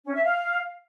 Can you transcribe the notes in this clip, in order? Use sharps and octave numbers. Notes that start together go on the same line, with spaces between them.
C#4
E5
F5